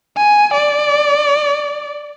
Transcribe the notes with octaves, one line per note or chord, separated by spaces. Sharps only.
G#5
D5